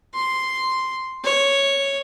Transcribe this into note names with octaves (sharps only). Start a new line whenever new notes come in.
C6
C#5